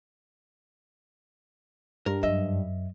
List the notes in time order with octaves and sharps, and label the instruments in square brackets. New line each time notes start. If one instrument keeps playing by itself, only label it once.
[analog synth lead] G2 [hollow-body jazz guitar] A#4
[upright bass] F#2 [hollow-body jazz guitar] D#5 E5